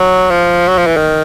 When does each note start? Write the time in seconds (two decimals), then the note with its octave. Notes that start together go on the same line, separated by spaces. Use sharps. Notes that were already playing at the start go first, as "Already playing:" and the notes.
Already playing: F#3
0.31 F3
0.68 F#3
0.78 F3
0.87 E3
0.97 D#3